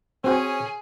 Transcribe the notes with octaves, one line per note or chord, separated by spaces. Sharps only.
C4 C#4 F#4 G#4 C5